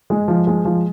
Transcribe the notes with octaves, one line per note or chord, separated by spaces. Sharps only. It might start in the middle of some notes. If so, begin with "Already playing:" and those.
G#3
F3
G#3
F3